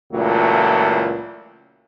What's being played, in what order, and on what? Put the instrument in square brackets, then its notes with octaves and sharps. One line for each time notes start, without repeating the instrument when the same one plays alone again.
[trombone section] C#2 A#2 E3 F#3 A3